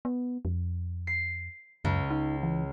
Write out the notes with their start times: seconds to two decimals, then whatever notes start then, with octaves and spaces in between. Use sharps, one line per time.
0.05 B3
0.45 F2
1.07 C7
1.85 C#2 F#2
2.11 D#4
2.43 E3